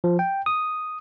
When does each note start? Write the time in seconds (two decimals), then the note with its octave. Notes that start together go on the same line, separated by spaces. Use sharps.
0.04 F3
0.19 G5
0.46 D#6